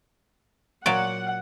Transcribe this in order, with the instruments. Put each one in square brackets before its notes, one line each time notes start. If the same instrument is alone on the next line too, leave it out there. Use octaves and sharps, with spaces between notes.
[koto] A#2 F#3 D5 [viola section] F#5